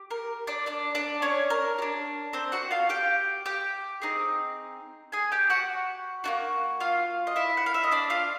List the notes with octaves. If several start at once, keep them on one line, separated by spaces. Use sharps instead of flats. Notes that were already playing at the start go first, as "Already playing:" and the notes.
Already playing: G4
A#4
D4 D5
D4 D5
D4 D5
C#4 C#5
A#4
G4
D4
C4 C5
F#4 F#5
F4 F5
G4 G5
G4 G5
C4 D#4 G#4
G#4 G#5
G4 G5
F#4 F#5
A#3 D4 F#4
F4 F5
D#5
E4 E5
F#5
F5
E5
D#5
D4 D5
F4 F5